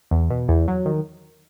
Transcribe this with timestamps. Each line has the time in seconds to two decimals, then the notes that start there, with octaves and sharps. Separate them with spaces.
0.11 E2
0.30 B2
0.48 E2
0.68 F#3
0.86 D#3